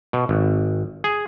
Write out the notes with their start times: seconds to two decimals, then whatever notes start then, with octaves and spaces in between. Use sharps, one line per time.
0.13 B2
0.29 G#1
1.04 G#4